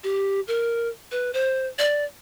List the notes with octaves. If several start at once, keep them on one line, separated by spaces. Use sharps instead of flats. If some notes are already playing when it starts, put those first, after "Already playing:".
G4
A#4
B4
C5
D5